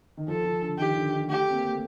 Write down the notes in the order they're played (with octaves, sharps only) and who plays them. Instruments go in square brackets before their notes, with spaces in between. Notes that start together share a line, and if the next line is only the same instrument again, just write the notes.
[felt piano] D#3
[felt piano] F3 [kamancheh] A4
[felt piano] F3
D3
[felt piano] D#3 [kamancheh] G4
[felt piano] D3
D#3
[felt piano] A3 [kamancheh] G4
[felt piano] C4
A#3
A3